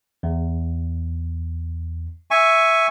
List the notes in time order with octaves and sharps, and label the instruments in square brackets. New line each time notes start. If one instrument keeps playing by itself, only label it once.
[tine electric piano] E2
[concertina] E5 G#5 C#6